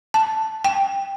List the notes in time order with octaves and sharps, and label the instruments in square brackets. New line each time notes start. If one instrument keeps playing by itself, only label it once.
[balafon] A5
G5